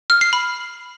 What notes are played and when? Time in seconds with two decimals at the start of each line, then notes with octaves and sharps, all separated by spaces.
0.10 F6
0.21 C7
0.33 B5